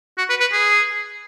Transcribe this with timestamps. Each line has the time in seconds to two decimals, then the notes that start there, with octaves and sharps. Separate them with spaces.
0.18 F#4
0.29 B4
0.40 B4
0.52 G#4